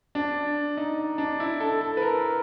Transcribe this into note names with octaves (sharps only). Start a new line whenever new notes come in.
D4
D#4
D4
E4
A4
A4
B4
A#4